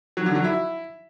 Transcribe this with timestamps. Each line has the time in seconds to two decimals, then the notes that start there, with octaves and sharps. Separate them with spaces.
0.17 F#3
0.26 D3
0.35 F#3
0.44 E4